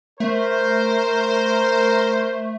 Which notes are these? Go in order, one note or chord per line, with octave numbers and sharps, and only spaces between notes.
A3 A#4 C5